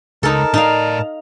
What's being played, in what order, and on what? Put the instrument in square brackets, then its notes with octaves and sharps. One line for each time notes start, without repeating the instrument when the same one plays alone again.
[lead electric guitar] C#2 [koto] D#4 A4 [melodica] A#4 A5
[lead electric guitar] A2 D5 [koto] D#4 F5